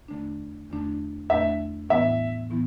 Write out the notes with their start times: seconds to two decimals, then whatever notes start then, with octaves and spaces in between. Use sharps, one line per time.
0.08 E2 D3 A3 D4
0.70 E2 D3 A3 D4
1.30 E2 D3 A3 D4 E5
1.89 A2 E3 B3 E4 E5
2.50 A2 E3 B3 E4